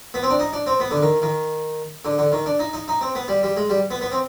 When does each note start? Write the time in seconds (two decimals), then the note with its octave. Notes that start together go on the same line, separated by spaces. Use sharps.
0.14 B3
0.23 C4
0.30 D4
0.40 D#4
0.53 D4
0.67 C4
0.80 B3
0.91 D3
1.02 D#3
1.22 D#3
2.05 D3
2.18 D3
2.32 D#3
2.46 D4
2.59 D#4
2.73 D#4
2.88 D#4
3.01 C4
3.15 B3
3.28 G3
3.43 G3
3.57 G#3
3.70 G3
3.91 B3
4.01 B3
4.12 C4